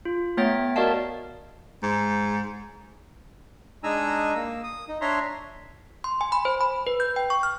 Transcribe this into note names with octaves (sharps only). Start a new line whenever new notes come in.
F4
A3 B3 C#5 E5 G5 A6
F#4 A#4 D5 D#5 F5 A5
G#2
G#3 D4 D#4 G#5 A#5 E6
A#3 E6
D#6
D#4
D4 C#5 E5 A#5 C6
C6
G#5
B5
C5
B5
B4
G6
G5
C#6
F6